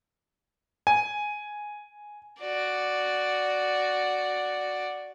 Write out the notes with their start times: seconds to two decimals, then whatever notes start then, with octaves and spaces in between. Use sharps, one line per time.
0.87 G#5
2.41 F#4 D5